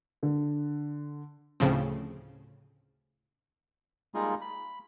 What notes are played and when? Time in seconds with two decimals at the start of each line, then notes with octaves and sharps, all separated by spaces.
0.23 D3
1.60 D2 A2 C#3 F3 C4
4.14 G3 G#3 A#3 D#4 F4 G#4
4.41 B5